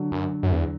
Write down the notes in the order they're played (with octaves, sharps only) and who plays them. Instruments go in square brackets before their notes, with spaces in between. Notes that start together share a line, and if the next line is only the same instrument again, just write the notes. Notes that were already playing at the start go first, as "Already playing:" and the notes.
Already playing: [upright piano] D3 F#3
[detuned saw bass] F#2
F#2
E2